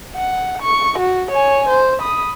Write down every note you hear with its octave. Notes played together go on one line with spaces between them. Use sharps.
F#5
C#6
F#4
C#5 G#5
C5
B5 D#6